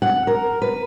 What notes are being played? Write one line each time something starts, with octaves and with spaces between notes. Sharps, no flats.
F#5
A#4
B4